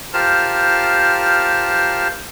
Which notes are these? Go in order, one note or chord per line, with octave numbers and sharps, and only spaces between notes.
F4 G4 A#4 C5 A5 F6